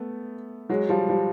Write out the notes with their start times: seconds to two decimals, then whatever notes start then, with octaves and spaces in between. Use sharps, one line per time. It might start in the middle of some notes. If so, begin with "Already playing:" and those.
Already playing: A3 B3
0.69 F#3 G#3
0.89 F3 G3
1.09 F3 G3